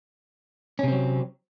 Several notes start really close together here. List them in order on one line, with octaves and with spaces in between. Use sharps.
C#4 C3 C4 F#3